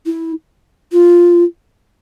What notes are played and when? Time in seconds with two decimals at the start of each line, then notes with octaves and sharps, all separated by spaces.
0.06 E4
0.92 F4